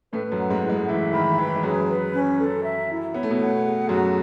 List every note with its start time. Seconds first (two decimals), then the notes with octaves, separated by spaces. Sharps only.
0.13 A2 A3 B4
0.32 F#2 F#3
0.38 F#5
0.50 G#2 G#3
0.63 E4
0.69 G#2 G#3
0.88 E3 E5
1.13 D#3 B5
1.38 E3 B4
1.56 G#3
1.63 F#2 F#3 G#4
1.89 B4
2.13 C#4
2.39 A4
2.64 E5
2.90 E4
3.14 B3 C#5
3.23 A3
3.30 B2 B3
3.40 F#5
3.65 G#4
3.89 F#2 F#3 F#4